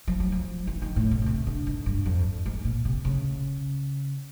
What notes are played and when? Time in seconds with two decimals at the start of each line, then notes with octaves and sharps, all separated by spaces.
0.08 F3
0.20 F#3
0.32 F3
0.67 E3
0.82 D#3
0.96 A2
1.11 B2
1.22 C#3
1.26 C3
1.47 D3
1.67 G#2
1.86 G2
2.06 F2
2.46 G#2
2.65 A#2
2.85 C3
3.05 C#3